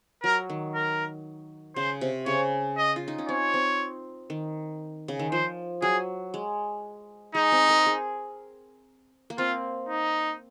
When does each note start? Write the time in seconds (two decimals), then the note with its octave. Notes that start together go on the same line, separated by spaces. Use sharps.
0.23 F#3 A#4
0.50 D#3
0.75 A#4
1.76 C#3 C5
2.01 C3
2.26 C#3 C#5
2.77 D#5
2.96 F4
3.08 D#4
3.18 C#4
3.28 C4 C#5
3.54 C4
4.30 D#3
5.08 C#3
5.19 D#3
5.32 F3 C5
5.82 F#3 G#4
6.34 G#3
7.35 G#3 D#4
7.52 C4
7.69 A#4
7.86 G#4
9.30 A#3
9.38 C4 F4
9.89 D#4